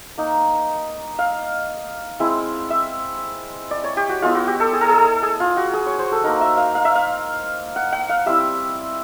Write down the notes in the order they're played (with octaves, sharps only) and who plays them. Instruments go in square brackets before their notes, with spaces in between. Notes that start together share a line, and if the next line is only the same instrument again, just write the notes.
[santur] A#3 D#4
F5
G#3 C4 E4
E5
D5
C#5
G4
F#4
G#3 B3 E4 F4
F#4
G4
A4
G#4
A4
G#4
A4
G#4
F4
F#4
G#4
C#5
C5
A4
A#3 D#4 A#4
E5
F5
F5
E5
F5
F#5
F#5
F5
G3 C4 E4 E5